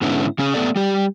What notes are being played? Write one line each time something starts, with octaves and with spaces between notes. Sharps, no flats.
G#2 D3 B3 C#4 E4
C#3 C#4 G#4
A3 B3 A4 D5
G3 G4